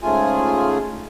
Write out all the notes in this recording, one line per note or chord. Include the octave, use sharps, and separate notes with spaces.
G#2 C#3 A3 F4 G#4 G#5